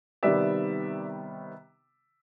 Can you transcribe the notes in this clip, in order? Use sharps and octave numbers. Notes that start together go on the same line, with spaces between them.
C3 D#3 G3 B3 D5 E5